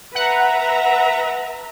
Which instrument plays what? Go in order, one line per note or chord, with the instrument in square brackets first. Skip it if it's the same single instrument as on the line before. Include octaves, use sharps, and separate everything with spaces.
[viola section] B4 E5 A#5 [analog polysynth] F#5